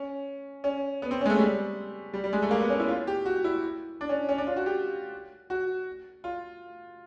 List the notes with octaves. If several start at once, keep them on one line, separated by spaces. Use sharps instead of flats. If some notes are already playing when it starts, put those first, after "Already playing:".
Already playing: C#4
C#4
B3
C4
C#4
G#3
A3
G3
G3
G3
G#3
A3
A#3
B3
C#4
E4
F4
G4
F#4
E4
D4
C#4
C#4
D4
F4
F#4
G4
F#4
F4